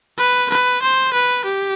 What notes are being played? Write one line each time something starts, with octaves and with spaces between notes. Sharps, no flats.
B4
B4
C5
B4
G4